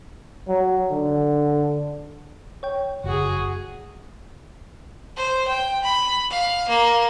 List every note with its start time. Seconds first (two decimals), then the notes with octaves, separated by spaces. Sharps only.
0.48 F#3
0.90 D3
2.63 C#5 G5
3.04 F#1 F#4 G#4
5.16 C5
5.48 G5
5.83 B5
6.30 F5
6.68 A#3